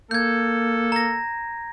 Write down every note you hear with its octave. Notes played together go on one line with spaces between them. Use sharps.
A#3 A4 G6 G#6
A#5 A#6